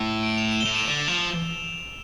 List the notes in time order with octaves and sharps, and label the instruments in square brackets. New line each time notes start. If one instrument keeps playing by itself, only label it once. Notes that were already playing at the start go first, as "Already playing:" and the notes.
Already playing: [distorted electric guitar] A2 [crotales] E6
[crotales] D7
F7
E7
G7
[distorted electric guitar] A2 [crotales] F7
[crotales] E7
F7
[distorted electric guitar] D3
[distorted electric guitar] F3 [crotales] F7